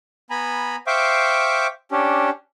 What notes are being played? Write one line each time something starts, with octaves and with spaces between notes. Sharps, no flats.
B3 G#5 A#5 B5
C5 E5 F5 G5 C#6 D6
C#4 D4 G4